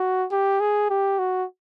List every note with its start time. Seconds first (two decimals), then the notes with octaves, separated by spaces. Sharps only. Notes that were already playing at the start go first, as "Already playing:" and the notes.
Already playing: F#4
0.32 G4
0.60 G#4
0.90 G4
1.19 F#4